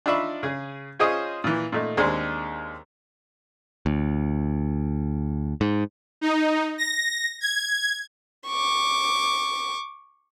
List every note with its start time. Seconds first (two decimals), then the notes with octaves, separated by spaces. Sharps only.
0.06 D4 D#4 F4 E5 B5 C#6
0.43 C#3 G#4
0.99 C#4 F4 G#4 C5 C#5 D#5
1.44 A#2 E3
1.72 A#2 A3 D#4
1.97 D#2 G#3 C4 D4 G#4 C6
3.86 D2
5.61 G#2
6.21 D#4
6.78 A#6
7.41 G#6
8.47 C#6 D6